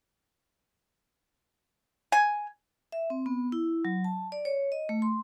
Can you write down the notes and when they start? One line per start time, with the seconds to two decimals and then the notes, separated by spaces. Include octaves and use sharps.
2.12 G#5
2.92 E5
3.10 C4
3.26 B3
3.52 E4
3.85 F#3
4.04 A5
4.32 D5
4.45 C#5
4.72 D#5
4.89 A3
5.02 C6